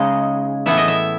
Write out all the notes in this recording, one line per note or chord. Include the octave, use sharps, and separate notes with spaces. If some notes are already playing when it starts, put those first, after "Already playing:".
Already playing: C#3 G#3 D#4 D#5
A2 E3 B3 E4 E5
D#5
E5